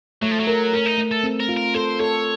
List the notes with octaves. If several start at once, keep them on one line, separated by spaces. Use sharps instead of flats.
F#3 A3
F3
F#3
A#4
C#4 A#4
D#4
A3
A4
C4
A#4
F4
A#4
A4 C5
A4 C#5